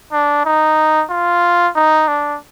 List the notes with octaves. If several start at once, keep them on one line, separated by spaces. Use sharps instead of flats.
D4
D#4
F4
D#4
D4